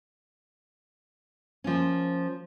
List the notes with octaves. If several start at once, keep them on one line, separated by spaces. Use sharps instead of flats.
F3 A#3 C#4